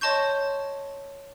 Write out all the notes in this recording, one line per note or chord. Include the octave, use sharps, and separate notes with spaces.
C#5 D#5 A5 C6 C#6 G6